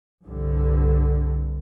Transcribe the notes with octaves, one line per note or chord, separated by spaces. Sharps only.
C2 G2 D3